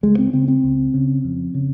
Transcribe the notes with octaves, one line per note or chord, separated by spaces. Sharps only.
C#2 G#3
C4
C#3 C4
C4
C#2
C#3
F2
C#3